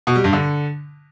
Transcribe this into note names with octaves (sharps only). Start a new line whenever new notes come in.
B2
G3
G2
D3